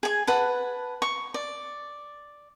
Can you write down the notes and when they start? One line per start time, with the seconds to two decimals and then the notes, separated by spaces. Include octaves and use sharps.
0.03 G#4 G#5
0.27 B4 F#5 A5
1.02 C#6
1.34 D5